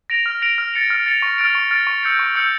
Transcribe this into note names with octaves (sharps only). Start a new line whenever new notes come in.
A#6 D7 F7
F6
A#6 D7 F7
F6
A6 C#7 F7
F6
A6 C#7 F7
C#6
F6 A6 D7
C#6
F6 A6 D7
C#6
E6 G6 C#7
C#6
E6 G6 C#7